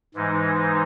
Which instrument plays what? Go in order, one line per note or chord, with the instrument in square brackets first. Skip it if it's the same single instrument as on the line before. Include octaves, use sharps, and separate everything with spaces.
[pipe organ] G#2 E3 G#3 D#4